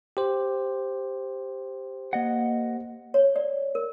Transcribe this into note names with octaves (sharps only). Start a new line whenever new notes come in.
G4 C5
A#3 D#5 F#5
C#5
D5
A#4